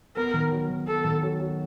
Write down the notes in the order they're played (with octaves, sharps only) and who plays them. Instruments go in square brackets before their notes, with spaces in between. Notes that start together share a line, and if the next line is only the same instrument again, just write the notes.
[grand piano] B3 [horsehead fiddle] A#4
[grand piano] D#3
F#3
D#3
[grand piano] B3 [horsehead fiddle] A4
[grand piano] D#3
F#3
F#3